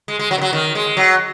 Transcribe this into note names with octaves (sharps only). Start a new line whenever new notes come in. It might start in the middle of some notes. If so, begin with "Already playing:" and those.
G#3
G#3
F#3
D#3
F#3
D#3
G#3
F#3